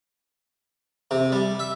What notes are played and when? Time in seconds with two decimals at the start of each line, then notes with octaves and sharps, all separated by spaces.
1.11 C3
1.32 G3
1.59 E5